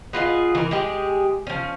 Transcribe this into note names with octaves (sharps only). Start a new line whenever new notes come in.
B3 F4 G#4 D#5
E3 A#4
G#3 G4 G#4
F3 C#4